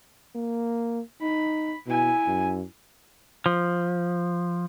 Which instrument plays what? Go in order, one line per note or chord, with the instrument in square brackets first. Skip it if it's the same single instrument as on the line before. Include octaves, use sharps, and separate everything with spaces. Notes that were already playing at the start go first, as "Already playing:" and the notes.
[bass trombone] A#3
[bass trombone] D#4 [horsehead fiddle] B5
[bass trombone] B2 [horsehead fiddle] E4 G#5
[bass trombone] F#2
[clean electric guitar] F3